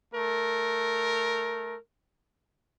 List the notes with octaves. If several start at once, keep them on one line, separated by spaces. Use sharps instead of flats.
A3 A#4